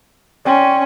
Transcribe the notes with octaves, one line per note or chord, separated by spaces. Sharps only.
C#4 D5 G5 C6